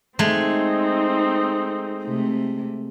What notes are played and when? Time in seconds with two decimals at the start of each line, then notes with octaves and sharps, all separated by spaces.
0.19 G#3 A3 C4 D#4
2.03 C3 A3